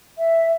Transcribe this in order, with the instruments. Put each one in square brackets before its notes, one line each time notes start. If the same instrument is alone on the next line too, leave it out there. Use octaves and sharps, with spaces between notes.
[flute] E5